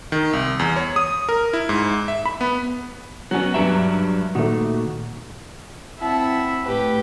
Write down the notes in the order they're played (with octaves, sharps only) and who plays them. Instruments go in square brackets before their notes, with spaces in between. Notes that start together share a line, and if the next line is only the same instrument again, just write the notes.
[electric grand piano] D#3
C2
E2
C#5
D#6
A#4
E4
G#2
E5
B5
B3
[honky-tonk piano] F#3 C#4 [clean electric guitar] B3 F#4
[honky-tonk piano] G2 A#5 D7 [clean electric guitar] F#3 B4 E5
[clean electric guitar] A#2 D#3 [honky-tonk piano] A3 F#4
[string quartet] C4 E4 E5 F#5 A5
A2 G4 B4